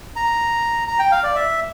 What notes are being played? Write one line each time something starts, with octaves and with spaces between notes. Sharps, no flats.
A#5
A#5
G5
F5
D5
E5